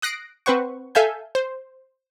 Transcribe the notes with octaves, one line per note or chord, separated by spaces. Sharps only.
D#6 F#6 A#6 C7 D7
C4 B4 C5 F#5 C#6
A4 E5 F5 G#5 G6
C5